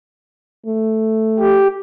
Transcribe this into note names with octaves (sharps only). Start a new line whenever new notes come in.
A3
G4